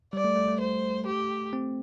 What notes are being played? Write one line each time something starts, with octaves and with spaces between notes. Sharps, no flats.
G3 D5
A3
A3
A3
C5
G4
C4